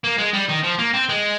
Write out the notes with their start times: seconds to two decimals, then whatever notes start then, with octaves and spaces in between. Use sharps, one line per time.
0.04 A#3
0.18 G#3
0.34 G3
0.49 D#3
0.64 F3
0.79 A#3
0.94 C4
1.09 G#3